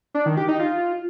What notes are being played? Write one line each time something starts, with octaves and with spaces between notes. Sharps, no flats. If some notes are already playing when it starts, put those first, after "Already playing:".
D4
D#3
G4
D#4
F4